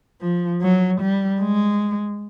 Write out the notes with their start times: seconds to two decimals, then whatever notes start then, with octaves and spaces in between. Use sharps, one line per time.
0.22 F3
0.62 F#3
1.01 G3
1.41 G#3